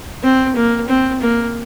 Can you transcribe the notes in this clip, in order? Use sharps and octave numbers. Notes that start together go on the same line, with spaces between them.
C4
A#3
C4
A#3